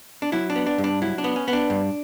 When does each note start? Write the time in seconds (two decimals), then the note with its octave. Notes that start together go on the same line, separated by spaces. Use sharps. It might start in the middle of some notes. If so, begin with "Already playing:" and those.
0.22 D4
0.32 F#3 E4
0.50 D4
0.56 B3
0.66 D4
0.78 G2
0.84 D4
1.02 F#3 E4
1.18 D4
1.24 B3
1.36 C#4
1.48 B3
1.53 D4
1.70 G2